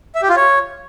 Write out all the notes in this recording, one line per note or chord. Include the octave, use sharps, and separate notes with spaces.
E5
G4
F4
C#5